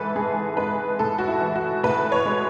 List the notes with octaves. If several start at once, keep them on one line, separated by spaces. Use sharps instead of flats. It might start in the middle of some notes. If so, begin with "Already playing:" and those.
Already playing: G#2 E3 A4 B4
G#2 G#4
G#3 B4
A2 A4
F#4
E4
E3
F#4
A2 B4
C#5
G#3